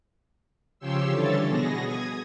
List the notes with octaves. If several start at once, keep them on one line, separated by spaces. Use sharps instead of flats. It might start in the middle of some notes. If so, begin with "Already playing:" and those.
C#3 F3 G4 C#5 C6 E6
D3 E3 G3 A4 C#5 A6
B2 B3 G#4 A#6
D#6 G#6